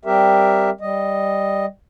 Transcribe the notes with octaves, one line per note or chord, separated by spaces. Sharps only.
G3 C4 G4 A#4 E5
G3 D#5